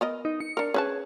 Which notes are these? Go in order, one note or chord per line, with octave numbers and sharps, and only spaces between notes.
B3 A#4 D#5
D#4
C#7
D4 A#4
C#4 G#4 B4 A5